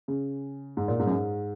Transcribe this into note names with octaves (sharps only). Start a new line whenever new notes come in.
C#3
G#2
A#2
G#2
F#2
G#2